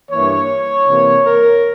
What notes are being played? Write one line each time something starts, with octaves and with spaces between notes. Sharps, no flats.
G2 E3 A#3 C#5
C3 E3 A#3
A#4